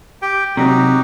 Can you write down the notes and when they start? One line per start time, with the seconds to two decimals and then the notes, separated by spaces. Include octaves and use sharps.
0.22 G4 G5
0.57 C3 F#3 D#4 F#4 G4